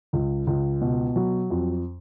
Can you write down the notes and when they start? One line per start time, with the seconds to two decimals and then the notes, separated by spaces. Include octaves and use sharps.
0.13 C#2
0.47 C#2
0.81 B2
1.16 F#3
1.50 F2